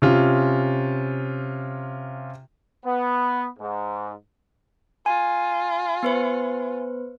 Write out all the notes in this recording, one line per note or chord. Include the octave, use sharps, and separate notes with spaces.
C3 C#4 F4
B3
G#2
F4 G#5
B3 B4 C5